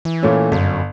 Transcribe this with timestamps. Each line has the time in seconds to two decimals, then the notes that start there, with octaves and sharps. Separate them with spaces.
0.05 E3
0.23 A#2 A3 C#4
0.52 G1 F#2